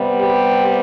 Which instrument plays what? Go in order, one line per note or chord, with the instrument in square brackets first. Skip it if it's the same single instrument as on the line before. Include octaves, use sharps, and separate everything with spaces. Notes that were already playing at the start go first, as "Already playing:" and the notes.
Already playing: [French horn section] C3 G3 B3
G4